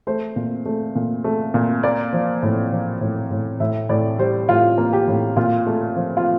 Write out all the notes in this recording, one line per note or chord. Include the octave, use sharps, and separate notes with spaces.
A3 C5
A#2
A3
A#2
A3
A#2
A#3 D5
F3
A2
F3
A2
A2
A2 E5
A2 D5
G3 C5
A2 F4
A#3
G4
A2
A#2 F4
A3
F3
F4